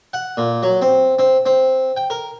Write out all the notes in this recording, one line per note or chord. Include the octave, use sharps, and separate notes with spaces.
F#5
A#2
F#3
C4
C4
C4
G5
A#4